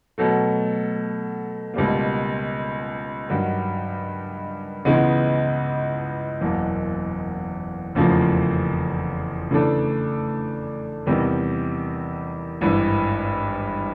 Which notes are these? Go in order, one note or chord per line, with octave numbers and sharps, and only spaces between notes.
B2 F#3 A3
C#2 B2 G3 A#3
G2 D#3 F#3
C#2 C#3 E3 G#3 B3
F#1 E2 B2 F#3 A#3
F1 E2 C#3 F3 A#3
C#3 E3 A3 D4
E2 C3 D#3 G3 B3
G#1 G2 E3